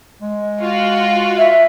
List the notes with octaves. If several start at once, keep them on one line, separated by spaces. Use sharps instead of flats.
G#3
F4 F#4
E5